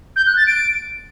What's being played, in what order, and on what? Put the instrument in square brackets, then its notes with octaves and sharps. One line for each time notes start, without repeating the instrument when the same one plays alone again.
[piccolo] G6
F#6
A6
D7